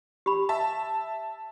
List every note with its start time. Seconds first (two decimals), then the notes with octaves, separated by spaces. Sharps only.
0.26 G4 B5
0.49 E5 A5